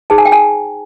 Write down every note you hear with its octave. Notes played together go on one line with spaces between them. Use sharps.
D#4 G#4 C5 A5
G#5
G5
G#5